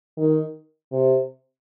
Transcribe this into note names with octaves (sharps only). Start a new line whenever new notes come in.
D#3
C3